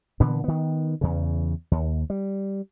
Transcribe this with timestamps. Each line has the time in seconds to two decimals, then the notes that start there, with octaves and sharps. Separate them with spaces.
0.20 A#2 D3 E3 B3
0.44 D#3 B3
1.01 E2 C#3
1.71 D#2
2.10 G3